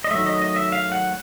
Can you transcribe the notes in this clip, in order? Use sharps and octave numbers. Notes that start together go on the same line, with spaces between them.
D#5
D#3 F#3 A3 E5
D#5
D#5
E5
F5
F#5